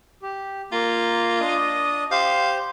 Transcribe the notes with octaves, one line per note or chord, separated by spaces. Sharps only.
G4
A#3 F4 A#5
D4 D#5 D#6
G4 C5 F5 G6